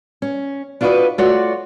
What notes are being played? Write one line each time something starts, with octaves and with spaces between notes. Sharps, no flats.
C#4
D4 F4 F#4 A#4 B4 D#5
A3 F4 F#4 C#5 D5